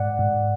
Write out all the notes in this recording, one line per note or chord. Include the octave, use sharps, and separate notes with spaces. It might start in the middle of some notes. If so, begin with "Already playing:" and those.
Already playing: G#2 D5 F#5
G#2